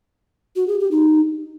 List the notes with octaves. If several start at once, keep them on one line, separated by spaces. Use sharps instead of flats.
F#4
G#4
G4
D#4